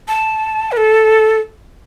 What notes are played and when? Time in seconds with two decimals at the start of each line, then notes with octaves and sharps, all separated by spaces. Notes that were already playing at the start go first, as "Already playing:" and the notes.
0.08 A5
0.72 B4
0.77 A4